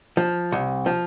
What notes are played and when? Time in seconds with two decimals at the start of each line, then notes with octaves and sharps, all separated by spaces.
0.17 F3
0.52 C2
0.86 F3